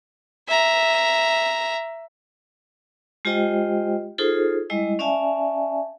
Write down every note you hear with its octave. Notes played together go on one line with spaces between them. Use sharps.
E5 A#5
G#3 F4 G4 C5 D#5 G5
D#4 F4 G#4 A4 C5
G3 G#3 E4 D#5
C#4 D5 E5 F5 G#5 A5